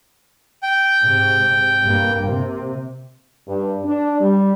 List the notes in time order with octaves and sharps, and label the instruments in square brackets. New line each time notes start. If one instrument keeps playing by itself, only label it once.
[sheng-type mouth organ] G5
[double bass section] G#2 C3
G2 A#3
C3
[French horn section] G2
D4
G3